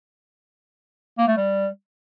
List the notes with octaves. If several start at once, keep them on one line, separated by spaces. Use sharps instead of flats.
A#3
A3
G3